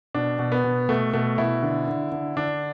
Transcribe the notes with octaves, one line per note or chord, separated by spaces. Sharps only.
B2 D4
B2
B3
B2
B2 A3
B2 A3
B2 E4
D3
D3
D3
D3 D4